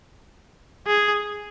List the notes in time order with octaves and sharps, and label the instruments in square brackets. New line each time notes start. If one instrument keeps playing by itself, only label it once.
[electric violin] G#4